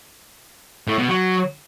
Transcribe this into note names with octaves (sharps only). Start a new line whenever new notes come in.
A2
B2
F#3